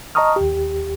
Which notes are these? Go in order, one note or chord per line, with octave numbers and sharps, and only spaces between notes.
D#5 A5 A#5 C#6 D#6 F6
D#2 G4